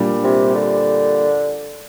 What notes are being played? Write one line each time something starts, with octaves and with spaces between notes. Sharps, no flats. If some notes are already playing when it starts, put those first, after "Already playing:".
Already playing: A#2 G3 D4
C3
D3